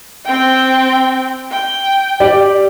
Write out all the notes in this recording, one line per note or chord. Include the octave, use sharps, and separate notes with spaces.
C4 G5
G5
G4 D5